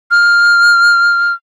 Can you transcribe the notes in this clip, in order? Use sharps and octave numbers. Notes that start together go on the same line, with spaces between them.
F6